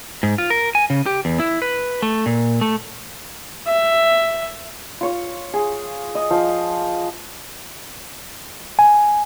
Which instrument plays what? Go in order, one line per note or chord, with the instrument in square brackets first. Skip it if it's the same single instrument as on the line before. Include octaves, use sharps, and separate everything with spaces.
[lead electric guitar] G#2
F4
A#4
G#5
C#3
G4
E2
E4
B4
A3
A#2
A3
[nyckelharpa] E5
[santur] F4 C#5
G#4
D#5
F3
[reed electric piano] G#5